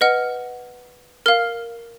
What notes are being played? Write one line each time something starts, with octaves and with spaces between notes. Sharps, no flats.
B4 D#5 F#5 F6
A#4 F5 F6